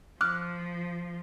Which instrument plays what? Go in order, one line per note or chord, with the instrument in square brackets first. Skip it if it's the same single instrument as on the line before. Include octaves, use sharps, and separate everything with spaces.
[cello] F3 [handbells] D6 F6 F#6